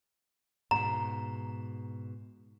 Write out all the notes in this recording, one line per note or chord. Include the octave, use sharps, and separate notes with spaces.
G#2 B2 A#5